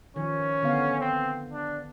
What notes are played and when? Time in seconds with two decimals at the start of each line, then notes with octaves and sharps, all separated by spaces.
0.16 D#3 F3 C#4
0.63 D3 B3 F5
1.00 C4
1.52 D4